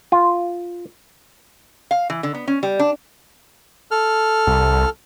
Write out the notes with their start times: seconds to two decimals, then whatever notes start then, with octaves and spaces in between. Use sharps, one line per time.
0.12 F4
1.91 F5
2.10 E3
2.23 D3
2.34 B3
2.48 C#4
2.63 G3
2.79 D4
3.91 A4 F6
4.47 C2